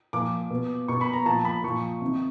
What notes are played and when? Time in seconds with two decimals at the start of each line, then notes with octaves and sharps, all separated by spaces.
0.13 A#2 F3 D6
0.50 B2
0.88 B2 C#6
1.01 B5
1.13 A#5
1.26 A#2 F3 A5
1.45 B5
1.64 A#2 F3 C#6
2.02 C3 D#3